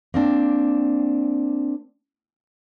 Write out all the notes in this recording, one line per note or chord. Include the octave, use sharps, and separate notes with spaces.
A#3 C4 D4